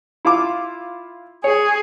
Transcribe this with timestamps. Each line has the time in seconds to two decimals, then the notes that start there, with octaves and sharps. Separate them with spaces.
0.25 E4 F4 D6
1.44 G#4 C#5